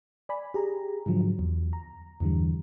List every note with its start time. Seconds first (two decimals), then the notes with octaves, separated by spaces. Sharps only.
0.29 D5 G#5 B5
0.54 G4 G#4 A#5
1.06 G#2 D3 F3 F#3
1.39 E2
1.73 A#5
2.20 E2 G2 D3 E3 G3